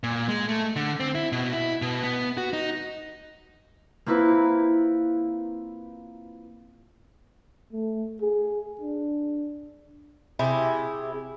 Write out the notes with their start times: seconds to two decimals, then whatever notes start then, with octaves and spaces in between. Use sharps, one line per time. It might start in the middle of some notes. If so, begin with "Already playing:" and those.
0.03 A#2
0.28 G#3
0.49 A3
0.76 D3
1.00 C4
1.15 E4
1.32 B2
1.53 E4
1.82 B2
2.03 B3
2.37 F#4
2.53 D#4
4.06 A#3 C4 E4 F4 B4
7.73 A3
8.21 G#4
8.81 D4
10.39 C3 E4 G4 G#4